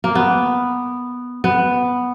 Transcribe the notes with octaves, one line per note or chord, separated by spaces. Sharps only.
A#3
B3
B3